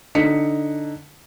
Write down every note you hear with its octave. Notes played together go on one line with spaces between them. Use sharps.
D3 D#4 B6 C#7